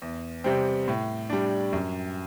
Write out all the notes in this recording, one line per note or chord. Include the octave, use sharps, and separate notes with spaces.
E2
C3 G3 C4
A2
G3 D4
F#2